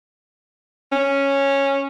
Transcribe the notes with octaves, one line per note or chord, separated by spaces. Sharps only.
C#4